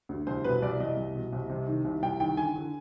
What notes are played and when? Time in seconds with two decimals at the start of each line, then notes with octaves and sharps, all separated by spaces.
0.09 D2
0.27 C2 C5
0.44 B2 B4
0.62 C2 D5
0.80 C2 D#5
0.97 C2
1.15 B2
1.33 C2
1.50 C3
1.67 D#3
1.85 C2
2.03 C2 G5
2.20 D#3 G5
2.37 D3 G#5
2.56 D3